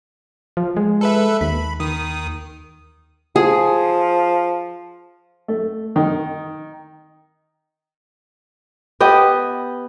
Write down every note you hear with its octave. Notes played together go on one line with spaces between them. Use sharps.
F3
G#3
A4 B4 E5
D#2 B5
D#3 D#6
F3 G#4
A3
D#3
B3 G4 D#5